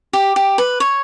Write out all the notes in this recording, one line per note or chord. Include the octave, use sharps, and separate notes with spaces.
G4
G4
B4
C#5